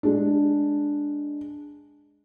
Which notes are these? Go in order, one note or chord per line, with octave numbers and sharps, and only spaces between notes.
G#3 D4